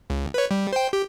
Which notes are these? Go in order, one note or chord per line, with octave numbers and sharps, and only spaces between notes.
C#2
B4 C#5
G3
C5 G5
G4